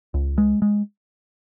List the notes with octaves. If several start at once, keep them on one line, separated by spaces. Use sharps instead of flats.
C#2
G#3
G#3